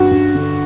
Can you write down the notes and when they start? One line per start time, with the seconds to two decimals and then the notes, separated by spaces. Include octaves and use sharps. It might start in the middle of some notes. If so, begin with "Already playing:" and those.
Already playing: G2 F#4
0.11 G2
0.35 D3